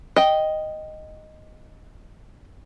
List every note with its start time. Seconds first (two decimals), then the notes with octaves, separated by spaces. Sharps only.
0.16 D#5 G5